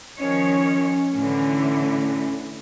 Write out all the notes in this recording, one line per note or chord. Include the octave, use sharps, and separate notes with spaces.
D#3 F3 C#4 C#5
A2 D3 E3